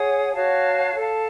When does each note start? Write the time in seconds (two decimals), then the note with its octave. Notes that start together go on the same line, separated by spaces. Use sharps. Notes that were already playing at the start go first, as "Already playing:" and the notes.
Already playing: G#4 C#5 F#5
0.32 F#4 C#5 F5 A5
0.96 A4 F5 A5